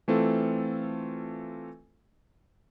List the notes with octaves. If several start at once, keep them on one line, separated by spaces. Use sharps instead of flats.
E3 A3 C4 F4 A4